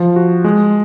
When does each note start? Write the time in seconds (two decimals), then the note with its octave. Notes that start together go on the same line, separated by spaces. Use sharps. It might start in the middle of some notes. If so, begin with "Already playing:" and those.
Already playing: F3
0.16 F#4
0.44 G#3